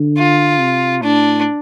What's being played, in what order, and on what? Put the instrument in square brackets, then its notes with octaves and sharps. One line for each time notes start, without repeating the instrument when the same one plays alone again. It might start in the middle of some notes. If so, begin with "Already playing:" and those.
Already playing: [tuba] D3
[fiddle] F4
[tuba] C3
[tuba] A2 [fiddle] D4